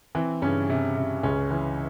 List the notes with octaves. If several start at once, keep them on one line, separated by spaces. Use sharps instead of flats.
E3 C4
G2 C#3 C#4
C3
C3
C#2 C#3 C#4
E3